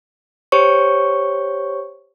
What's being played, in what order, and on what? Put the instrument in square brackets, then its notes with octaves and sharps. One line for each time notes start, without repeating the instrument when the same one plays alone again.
[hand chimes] G4 C5 C#5 C#6